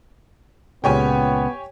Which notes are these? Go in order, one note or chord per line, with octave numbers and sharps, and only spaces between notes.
C#2 A#2 C#3 B3 G4 C#5 G#5